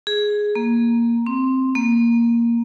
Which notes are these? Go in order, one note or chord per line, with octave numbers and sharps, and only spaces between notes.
G#4
A#3
C4
A#3